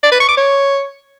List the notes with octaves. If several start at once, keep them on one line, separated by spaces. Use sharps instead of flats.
D5
B4
C#6
D6
C#5